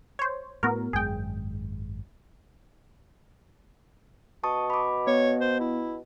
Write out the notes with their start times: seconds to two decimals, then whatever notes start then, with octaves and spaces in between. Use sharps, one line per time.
0.19 C5 C#5
0.63 A2 B3 F#4 A#4
0.93 G#1 F#2 G#3 G#4 G5
4.44 B2 A5 C#6 D#6
4.70 B5 D6
5.07 B3 C#5
5.41 C5
5.60 E4